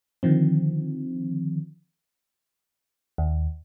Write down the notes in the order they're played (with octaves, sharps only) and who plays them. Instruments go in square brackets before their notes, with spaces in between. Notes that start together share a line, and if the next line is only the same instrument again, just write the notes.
[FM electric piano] D3 D#3 F3 C4
D#2